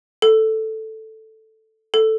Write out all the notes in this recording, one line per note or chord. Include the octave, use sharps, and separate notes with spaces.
A4
A4